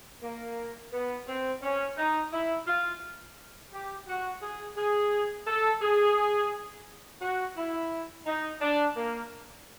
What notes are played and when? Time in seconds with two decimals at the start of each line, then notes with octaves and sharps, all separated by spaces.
0.22 A#3
0.92 B3
1.27 C4
1.62 C#4
1.97 D#4
2.32 E4
2.67 F4
3.72 G4
4.07 F#4
4.42 G#4
4.77 G#4
5.47 A4
5.81 G#4
7.21 F#4
7.56 E4
8.26 D#4
8.61 D4
8.96 A#3